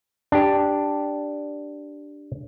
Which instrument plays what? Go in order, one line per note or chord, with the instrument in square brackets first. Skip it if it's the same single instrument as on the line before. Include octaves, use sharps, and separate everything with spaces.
[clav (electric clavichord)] D4 G4